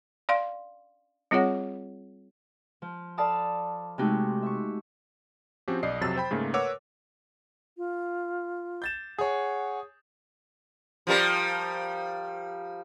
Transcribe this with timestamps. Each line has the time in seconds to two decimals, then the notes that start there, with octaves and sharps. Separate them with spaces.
0.29 D5 F5 C6
1.31 G3 C4 F4 G#4 C#5 F#5
2.82 F3
3.17 A4 D5 F5 A5 B5 D#6
3.98 C3 G#3 A3 D#4 F#4 G4
4.42 E5 C#6
5.68 F3 C4 C#4 F#4 G4
5.83 B1 D5 D#5 C7
6.01 F2 C3 F#3 A5 E6 A6
6.16 C5 G5 B5
6.31 G#2 C#3 A3 A#3
6.54 A#4 B4 C#5 F#5 D6 E6
7.77 F4
8.82 G6 A6 E7
9.18 G#4 C#5 F#5
11.07 F3 G3 A#4